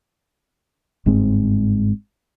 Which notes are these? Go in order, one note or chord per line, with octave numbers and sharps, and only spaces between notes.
G1 G#2 G#3 C4